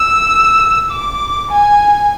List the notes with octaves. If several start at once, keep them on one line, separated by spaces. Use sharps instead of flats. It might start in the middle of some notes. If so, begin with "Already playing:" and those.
Already playing: E6
D6
G#5